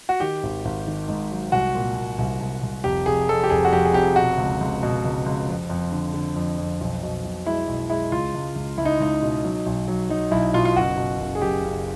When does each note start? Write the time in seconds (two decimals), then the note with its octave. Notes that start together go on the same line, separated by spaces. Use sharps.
0.09 F#4
0.20 D#3 G4
0.43 G#1
0.65 G#1
0.87 D#3
1.08 G#2
1.31 F#3
1.52 C2 F#4
1.75 A#2
1.96 A#2
2.19 C2
2.41 C2
2.63 C2
2.84 F1 G4
3.06 F1 G#4
3.29 F2 A4
3.44 G4
3.50 F1 G#4
3.65 F#4
3.72 F2 G4
3.85 G#4
3.94 F1 G4
4.16 B2 F#4
4.38 C#2
4.61 C#2
4.83 B2
5.05 C#2
5.26 C#2
5.48 F2
5.70 F2
5.92 D3
6.14 D3
6.36 F2
6.58 F2
6.81 B1
7.03 B2
7.24 B1
7.46 G#3 E4
7.67 B1
7.90 G#3 E4
8.12 C#2 F4
8.34 C#2
8.56 C#2
8.77 C#2 E4
8.85 D#4
9.00 C#2 D#4
9.22 B2
9.44 F#3
9.66 B1
9.88 F#3
10.09 F#3 D#4
10.31 B1 E4
10.54 B2 F4
10.65 F4
10.76 F#1 F#4
10.98 B2
11.20 F#1
11.35 G#4
11.42 F#1 G4
11.64 F#1